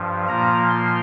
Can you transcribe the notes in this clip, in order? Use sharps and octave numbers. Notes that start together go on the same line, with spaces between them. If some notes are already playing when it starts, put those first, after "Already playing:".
Already playing: G2 F3
A#2 F3 A#3 A#5
C6